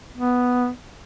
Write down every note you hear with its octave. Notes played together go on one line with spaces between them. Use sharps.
B3